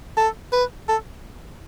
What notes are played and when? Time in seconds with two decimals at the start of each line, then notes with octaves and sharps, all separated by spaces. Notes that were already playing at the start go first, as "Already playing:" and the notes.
0.17 A4
0.53 B4
0.89 A4